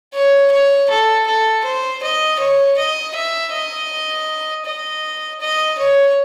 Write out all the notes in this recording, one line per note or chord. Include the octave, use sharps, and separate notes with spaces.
C#5
C#5
A4
A4
C5
D#5
C#5
D#5
E5
D#5
D#5
D#5
C#5